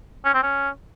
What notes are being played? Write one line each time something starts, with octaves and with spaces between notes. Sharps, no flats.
C#4
C4
C#4